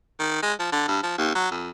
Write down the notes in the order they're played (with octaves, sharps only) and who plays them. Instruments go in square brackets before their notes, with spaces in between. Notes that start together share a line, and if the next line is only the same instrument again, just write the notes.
[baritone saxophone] D#3
G#3
F3
D3
G2
F3
D#2
F#3
F2